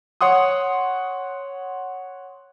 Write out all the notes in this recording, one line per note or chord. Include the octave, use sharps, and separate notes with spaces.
C#5 F#5 C6 D#6